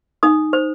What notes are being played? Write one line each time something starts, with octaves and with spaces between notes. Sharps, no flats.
D#4 D#6
C5